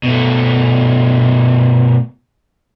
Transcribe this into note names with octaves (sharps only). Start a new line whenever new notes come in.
B2 A3